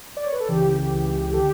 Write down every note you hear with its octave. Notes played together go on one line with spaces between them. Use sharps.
D5
C#5
B4
A4
C#2 C#3 E3 G4
C#2 C#3 E3
A4
D3 G4